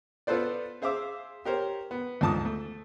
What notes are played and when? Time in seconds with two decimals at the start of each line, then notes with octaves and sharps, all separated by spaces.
0.27 B3 F4 A4 B4 C5 D5
0.82 G#4 C5 E5 F5 D6 E6
1.45 G4 A#4 C5 C#5
1.91 B3
2.21 D2 G#2 F3 A5 D6 D#6
2.45 A3